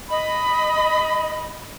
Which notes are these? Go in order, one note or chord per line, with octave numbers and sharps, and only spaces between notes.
D#5 B5